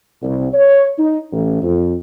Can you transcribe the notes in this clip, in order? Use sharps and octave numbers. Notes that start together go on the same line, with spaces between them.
C2
C#5
D#4
A1
F2